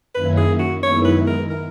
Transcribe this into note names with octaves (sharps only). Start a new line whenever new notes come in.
F#2 D#3 A#3 C#4 E4 B4
G#4
F#4
F#2 D#3 G#3 B3 E4 C#5
B4
A#4
A#4